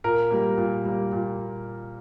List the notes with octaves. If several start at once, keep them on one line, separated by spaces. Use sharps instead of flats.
A#2 A#4
G3 A#3
A#2
G3 A#3
A#2